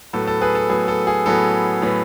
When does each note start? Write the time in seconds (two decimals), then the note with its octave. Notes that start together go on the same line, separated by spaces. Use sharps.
0.13 A2 F#3 B3 A4
0.27 A4
0.41 G#4 B4
0.55 A4
0.69 A2 F#3 B3 G#4
0.88 A4
1.07 G#4
1.26 A2 F#3 B3 A4
1.82 A2 F#3 B3